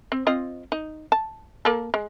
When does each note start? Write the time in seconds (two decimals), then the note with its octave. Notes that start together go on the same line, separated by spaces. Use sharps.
0.12 C4
0.27 C4 F4 D#5
0.72 D#4
1.12 A5
1.65 A#3 A4
1.94 G#3